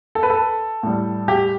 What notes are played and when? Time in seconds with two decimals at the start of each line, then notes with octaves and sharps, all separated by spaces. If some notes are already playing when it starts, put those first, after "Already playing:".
0.15 A4
0.23 B4
0.30 A4
0.83 A2 G3
1.28 G4